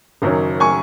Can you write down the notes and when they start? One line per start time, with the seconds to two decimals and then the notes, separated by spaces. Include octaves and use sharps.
0.22 F#1 F#2 D#3 F#3 C#4
0.60 G#5 C#6